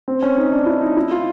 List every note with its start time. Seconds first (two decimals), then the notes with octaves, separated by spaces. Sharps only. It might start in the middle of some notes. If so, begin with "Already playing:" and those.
0.08 C4
0.23 C#4
0.38 D#4
0.53 D4
0.66 E4
0.81 D#4
0.97 E4
1.11 F4